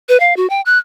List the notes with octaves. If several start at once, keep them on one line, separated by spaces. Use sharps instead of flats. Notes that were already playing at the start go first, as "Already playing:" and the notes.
B4
F5
F#4
G5
F#6